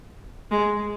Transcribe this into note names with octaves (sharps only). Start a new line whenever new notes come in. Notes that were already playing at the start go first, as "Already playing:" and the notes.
G#3